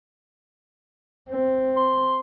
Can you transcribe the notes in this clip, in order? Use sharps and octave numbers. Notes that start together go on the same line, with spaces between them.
C4
C6